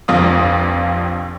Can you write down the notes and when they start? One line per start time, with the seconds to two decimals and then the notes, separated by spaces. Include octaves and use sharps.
0.08 F1 A#1 F2 F4 D#6